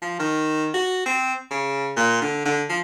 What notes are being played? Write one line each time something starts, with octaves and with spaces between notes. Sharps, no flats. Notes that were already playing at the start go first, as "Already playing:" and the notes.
F3
D#3
F#4
C4
C#3
A#2
D3
D3
F3